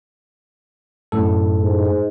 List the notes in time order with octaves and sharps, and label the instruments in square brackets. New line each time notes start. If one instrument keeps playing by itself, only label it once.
[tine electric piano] F#2 A2 A4
[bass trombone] G#2